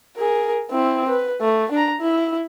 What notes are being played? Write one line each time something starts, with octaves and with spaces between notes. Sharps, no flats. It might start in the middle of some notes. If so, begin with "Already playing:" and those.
G#4 A#4
C4 E4
B4
A3
D4 A#5
E4